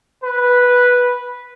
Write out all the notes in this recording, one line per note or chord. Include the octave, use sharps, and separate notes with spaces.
B4